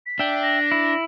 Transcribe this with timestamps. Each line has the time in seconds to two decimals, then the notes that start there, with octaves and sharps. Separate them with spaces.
0.06 B6
0.19 D4 E5 G5
0.43 A#6
0.72 E4